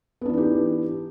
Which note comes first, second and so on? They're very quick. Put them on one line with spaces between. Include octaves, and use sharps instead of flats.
B3 D4 E3 D#4 G4